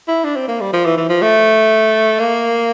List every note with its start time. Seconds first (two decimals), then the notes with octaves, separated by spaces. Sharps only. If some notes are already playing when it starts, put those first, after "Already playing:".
0.08 E4
0.24 D4
0.36 C4
0.48 A#3
0.61 G3
0.73 F3
0.86 E3
0.98 E3
1.10 F3
1.22 A3
2.19 A#3